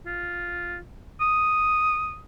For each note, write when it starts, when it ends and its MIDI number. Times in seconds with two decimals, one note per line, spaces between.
0.06 0.78 65
1.21 2.20 87